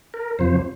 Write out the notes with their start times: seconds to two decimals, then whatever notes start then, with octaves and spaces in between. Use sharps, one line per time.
0.14 A#4
0.39 F2 C3 F3 C5